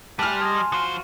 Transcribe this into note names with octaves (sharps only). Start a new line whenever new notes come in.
G3 B4 G#5 A5 C6 F6
G#4 D#5
F3 F4 F#4 C5